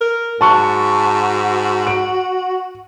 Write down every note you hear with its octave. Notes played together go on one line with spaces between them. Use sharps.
A#4
G#2 F#4 A5 C#6
D7